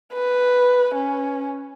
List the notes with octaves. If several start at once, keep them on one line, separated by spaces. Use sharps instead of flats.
B4
C#4